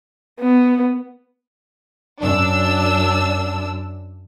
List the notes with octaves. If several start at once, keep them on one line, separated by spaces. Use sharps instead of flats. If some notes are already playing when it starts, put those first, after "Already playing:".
B3
F#2 D4 E6